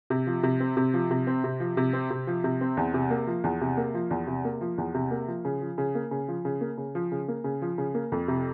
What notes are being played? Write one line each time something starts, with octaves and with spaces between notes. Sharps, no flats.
C3
F3
C3
C4
C3
F3
C3
C4
C3
F3
C3
C4
C3
F3
C3
C4
E2
C3
A#3
F3
E2
C3
A#3
F3
E2
C3
A#3
F3
E2
C3
A#3
F3
C#3
F3
C#3
A#3
C#3
F3
C#3
A#3
C#3
F3
C#3
A#3
C#3
F3
C#3
A#3
F2
C3